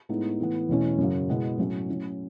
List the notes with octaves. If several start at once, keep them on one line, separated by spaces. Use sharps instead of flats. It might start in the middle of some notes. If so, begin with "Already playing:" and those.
A2 G#3 B3 D#4
A2 E3 B3
E2 B2 A3 C#4 E4
F#2 C#3 F#3
B2 G#3 B3 E4
A2 F#3 C#4 E4
A2 F#3 C#4 E4